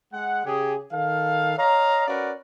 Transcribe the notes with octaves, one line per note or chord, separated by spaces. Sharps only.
G#3 F#5
C#3 G4 G#4
D#3 A4 F5
C#5 D#5 F5 A#5
C#4 F#4 A#4 B4 D5